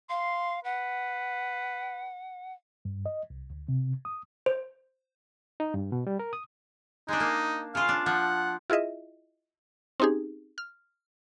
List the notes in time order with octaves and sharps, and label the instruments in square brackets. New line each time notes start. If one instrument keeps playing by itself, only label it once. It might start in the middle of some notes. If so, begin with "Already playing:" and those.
[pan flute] F5 [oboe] C6
[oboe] B4 [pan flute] F#5
[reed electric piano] G2
D#5
C2
D2
C3
D#6
[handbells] C5
[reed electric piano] D#4
G2
B2
G3
A#4
D#6
[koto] G#3 D4 [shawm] D#4
[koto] A#3
[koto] C#3 F4 [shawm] F5
[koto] D4
[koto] F3 [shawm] F#5
[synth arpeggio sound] E4 F4 G#4 D#5 E5
C4 C#4 D#4 G4 G#4
F6